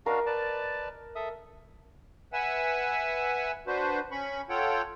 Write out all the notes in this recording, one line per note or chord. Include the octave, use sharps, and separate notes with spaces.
D4 F#4 A#4 D#5 F5
B4 D5 A5
A4 E5 D#6
B4 E5 F#5 G#5 E6
D4 F#4 B4 C5
C#4 B5 C#6
F4 A4 C#5 F#5 G5